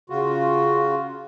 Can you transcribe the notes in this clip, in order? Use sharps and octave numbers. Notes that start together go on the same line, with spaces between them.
C#3 F4 F#4